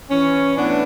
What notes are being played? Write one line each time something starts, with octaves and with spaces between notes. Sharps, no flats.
E3 C#4
A2 B3 D4